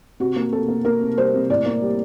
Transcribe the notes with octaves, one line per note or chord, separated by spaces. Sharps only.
C3 F#4
A#3
C3 A4
A#3
A#3 A#4
C3
G3 C5
C3
A2 D5
A#3
G3